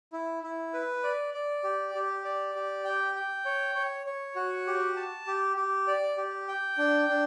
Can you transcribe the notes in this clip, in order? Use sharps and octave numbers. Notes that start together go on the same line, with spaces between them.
E4
E4
B4
D5
D5
G4
G4
D5
G4
G5
G5
C#5
C#5
C#5
F#4
G4
A5
G4
G4
D5
G4
G5
D4
D4